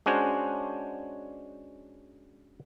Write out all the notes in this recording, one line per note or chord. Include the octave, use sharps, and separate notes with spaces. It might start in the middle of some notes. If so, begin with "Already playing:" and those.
G#3 C#4 D4 F#4 C5 C#5